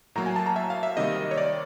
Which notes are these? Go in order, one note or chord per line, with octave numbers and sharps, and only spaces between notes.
A2 F#3 A#3 A#5
G#5
A5
A#5
E5
F5
E5
C3 D#3 G3 A#3 D#5
C#5
D5